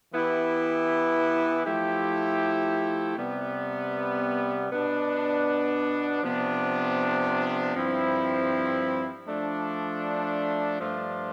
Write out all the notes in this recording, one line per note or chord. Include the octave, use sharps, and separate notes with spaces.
E3 B3 E4 G4
F3 A3 E4 G4
C3 G3 B3
B2 B3 D4
C3 F3 B3 D4
G2 F3 C4 E4
F3 A3 D4
G2 F3 A3 D4 F4